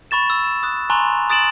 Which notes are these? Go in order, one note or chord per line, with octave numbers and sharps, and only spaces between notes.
B5 C#6 A6 E7
E6
E7
D#6 F#6
G#5 A#5 C6 C#6 F#6 F7
D#6 A6 D7 E7 F#7